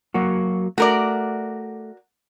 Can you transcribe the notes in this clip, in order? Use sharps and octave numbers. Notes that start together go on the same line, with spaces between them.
F#3 A#3 F#4
A3 F#4 A#4 D5